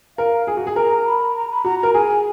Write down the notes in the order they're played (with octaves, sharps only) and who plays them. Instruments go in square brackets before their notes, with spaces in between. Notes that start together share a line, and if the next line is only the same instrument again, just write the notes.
[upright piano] A#4 [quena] F5
[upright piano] G#4 [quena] G#5
[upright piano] F#4
G#4
[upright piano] A#4 [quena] A#5
[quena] B5
A#5
B5
[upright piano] F#4 [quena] A#5
[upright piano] A#4 [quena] A#5
[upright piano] G#4 [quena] G#5